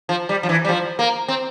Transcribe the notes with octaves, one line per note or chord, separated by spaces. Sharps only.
F3
G3
F3
E3
G3
F3
A#3
C4